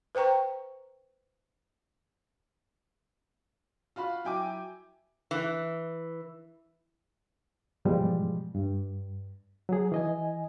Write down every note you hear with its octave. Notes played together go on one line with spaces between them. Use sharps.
B4 C5 G5 A#5 C#6
F4 F#4 F5 B5
F#3 E4 G5 G#5 D6
E3
G#2 B2 E3 F3 G3 G#3
G2
F#3 G#4
E3 D#5 G#5